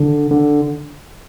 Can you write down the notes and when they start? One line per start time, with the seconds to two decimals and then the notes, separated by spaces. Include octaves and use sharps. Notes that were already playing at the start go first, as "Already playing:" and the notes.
Already playing: D3
0.31 D3